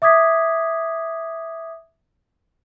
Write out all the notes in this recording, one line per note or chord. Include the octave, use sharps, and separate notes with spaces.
E5 D6 D#6 G#6 B6